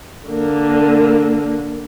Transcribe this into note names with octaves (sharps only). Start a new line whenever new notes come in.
D3 A#3